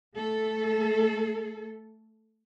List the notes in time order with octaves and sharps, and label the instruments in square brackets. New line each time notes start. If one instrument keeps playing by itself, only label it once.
[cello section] A3 A4